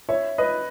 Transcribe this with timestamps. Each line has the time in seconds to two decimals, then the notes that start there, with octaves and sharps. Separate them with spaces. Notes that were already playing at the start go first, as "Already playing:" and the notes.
0.09 C#5 E5
0.38 B4 D#5